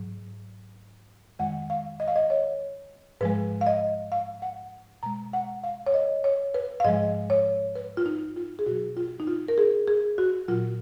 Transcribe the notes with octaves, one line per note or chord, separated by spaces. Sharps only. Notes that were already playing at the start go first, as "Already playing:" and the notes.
Already playing: G#2 F#3
F2 D#3 G#3 F#5
F5
D#5
F5
D#5
C#5
G#2 F3 G#3 B4
F5
D#5
F5
F#5
B2 G#3 A#5
F#5
F5
C#5
D#5
C#5
B4
F5
G#2 F3 G#3 D#5
C#5
B4
F4
D#4
F4
G#4
B2 F#3 F#4
F4
D#4
F4
A#4
G#4
G#4
F#4
A#2 F#3 F4